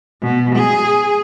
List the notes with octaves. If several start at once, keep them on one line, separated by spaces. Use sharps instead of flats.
B2
G#4